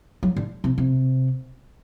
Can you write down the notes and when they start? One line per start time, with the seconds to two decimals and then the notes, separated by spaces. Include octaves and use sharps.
0.23 F#3
0.37 D3
0.64 C3
0.78 C3